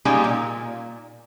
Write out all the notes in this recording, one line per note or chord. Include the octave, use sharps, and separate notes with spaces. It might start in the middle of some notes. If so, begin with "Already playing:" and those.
G3 G#3 A#3 C#4 D#4 G4
A#2